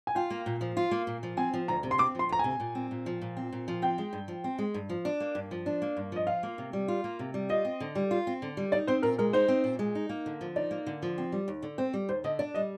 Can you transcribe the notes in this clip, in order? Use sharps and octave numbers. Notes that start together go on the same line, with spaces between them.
G#5
F4 G5
A#3
A#2
F3
F4
A#3
A#2
F3
C4 G#5
F3
D2 A#5
C3
C6
C4 D6
F3 C6
D2 A#5
C3 G#5
A#2
C4
A#2
F3
A#2
C4
A#2
F3
C4 G5
G#3
G2
F3
C4
G#3
G2
F3
D4
A#3
G2
F3
D4
A#3
G2
F3 D#5
F4 F5
A#3
C3
G3
F4
A#3
C3
G3
F4 D#5
C4
D3
G3
F4
C4
D3
G3
D#4 D5
C4 C5
A#2 A#4
G#3 A#4
D#4 C5
C4
A#2
G#3
D#4
A#3
D3
F3
D#4 D5
A#3
D3
F3
C4
G3
D#2
D3
C4 C5
G3
D#2 C5
D3 D#5
D4 D5
G3 D#5